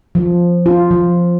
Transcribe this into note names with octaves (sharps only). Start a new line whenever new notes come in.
F3
F4
F3